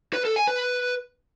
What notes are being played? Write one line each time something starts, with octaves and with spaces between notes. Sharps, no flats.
B4
A4
G#5
B4